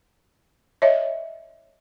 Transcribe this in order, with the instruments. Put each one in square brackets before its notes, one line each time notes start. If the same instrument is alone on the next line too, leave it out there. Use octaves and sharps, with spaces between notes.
[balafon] C#5 D#5 E5